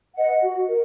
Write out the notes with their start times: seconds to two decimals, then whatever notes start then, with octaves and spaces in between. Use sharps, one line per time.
0.15 B4 D#5 F#5
0.42 F#4
0.68 A#4